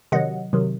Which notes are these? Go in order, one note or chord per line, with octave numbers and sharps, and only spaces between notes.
C3 D#3 F#3 D#5 F#5
C3 D#3 F#3